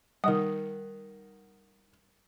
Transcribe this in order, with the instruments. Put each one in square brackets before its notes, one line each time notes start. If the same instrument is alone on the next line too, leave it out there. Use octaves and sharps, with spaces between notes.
[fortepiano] D#3 D#5 F#5 [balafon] G3 [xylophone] A#4 D#6